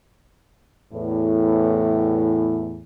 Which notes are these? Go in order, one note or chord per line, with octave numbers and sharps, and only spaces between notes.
E2 A2